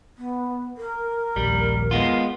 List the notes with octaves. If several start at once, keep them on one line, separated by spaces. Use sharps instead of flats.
B3
A#4
A#1 D#2 G3
G#3 B3 F4